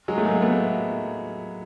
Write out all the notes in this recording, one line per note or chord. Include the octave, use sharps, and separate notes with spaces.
F#3 G#3
A3
G#3 A#3
A3 B3